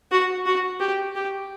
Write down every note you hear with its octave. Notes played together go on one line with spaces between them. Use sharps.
F#4
F#4
G4
G4